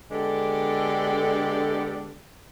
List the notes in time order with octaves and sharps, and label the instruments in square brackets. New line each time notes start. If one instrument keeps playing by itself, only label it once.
[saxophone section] D3 G#3 B3 D4 G4 A4